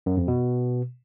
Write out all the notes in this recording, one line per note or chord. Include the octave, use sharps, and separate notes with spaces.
F#2
F2
B2